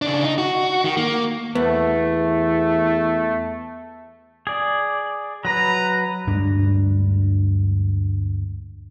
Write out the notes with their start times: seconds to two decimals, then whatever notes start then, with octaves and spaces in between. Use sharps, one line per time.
0.02 C#3 D4
0.24 D#4
0.38 F#4
0.84 D#3
0.97 A#3
1.55 E2 A3 B3
4.47 G#4 D5
5.45 F#3 B4 A#5
6.27 D2 G2 G#3 D4